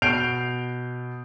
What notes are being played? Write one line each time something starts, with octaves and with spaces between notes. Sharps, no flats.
B2 G6 C7 D7 F7